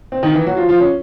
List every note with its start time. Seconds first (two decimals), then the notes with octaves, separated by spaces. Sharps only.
0.12 C4
0.23 D#3 D#4
0.34 E3 E4
0.46 F#3 F#4
0.57 F3 F4
0.69 F3 F4
0.80 C#4